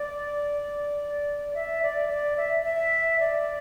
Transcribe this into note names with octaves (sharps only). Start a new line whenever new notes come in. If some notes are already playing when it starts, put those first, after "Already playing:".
Already playing: D5
E5
D5
D5
E5
E5
D5